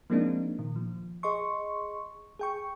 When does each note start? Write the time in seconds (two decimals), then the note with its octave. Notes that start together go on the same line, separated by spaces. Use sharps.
0.10 F3 G#3 A#3 C4 D4 D#4
0.59 A#2 D#3
0.76 F3
1.23 G#4 D#5 C6 C#6
2.39 G#4 G5 C#6